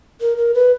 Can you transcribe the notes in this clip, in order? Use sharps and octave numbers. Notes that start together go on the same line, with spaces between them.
A#4
A#4
B4